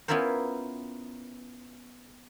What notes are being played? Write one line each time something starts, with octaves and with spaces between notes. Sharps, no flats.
B3 C#4 E4 F4 A#4 C5